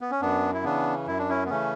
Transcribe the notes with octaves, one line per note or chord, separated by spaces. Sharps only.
B3
C#4
F#2 B3 D4
E4
C#3 E3 B3 D4
F#2 E4
D4
C#4 E4
B3
C#3 E3 A3 C#4